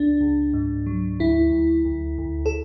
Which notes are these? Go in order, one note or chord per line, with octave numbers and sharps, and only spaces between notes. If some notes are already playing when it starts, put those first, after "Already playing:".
Already playing: C#2 D4
C#2
G#2
F#3
D2 E4
D2
D2
D2
A4